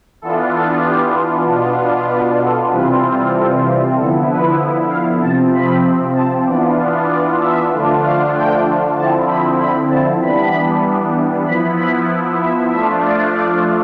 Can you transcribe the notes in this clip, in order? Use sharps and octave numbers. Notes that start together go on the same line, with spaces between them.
E3 B3 D4 F4 A4
A4
G4
B2 B3 D4 F4
B4
A4
C3 E3 G3 C4 F4 B4
C5
A4
G4
D3 F3 B3 E4 A4
B4
F5
C3 F3 C4 A5
B5
A5
E3 B3 D4 F4 D5
D5
E5
D3 F3 A3 D4 F4
F5
G5
D3 F3 C4 E4 A5
B5
B5
A5
E3 G3 B3 D4 B5
F3 B3 E4 B5
B5
E5
F3 A3 D4 F4 E5
D5
D5